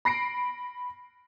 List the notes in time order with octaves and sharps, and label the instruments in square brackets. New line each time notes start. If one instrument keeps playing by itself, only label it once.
[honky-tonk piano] B5 A#6 C7 D7